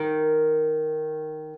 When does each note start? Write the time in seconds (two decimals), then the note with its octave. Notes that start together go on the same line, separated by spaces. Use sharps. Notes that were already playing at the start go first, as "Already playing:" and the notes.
Already playing: D#3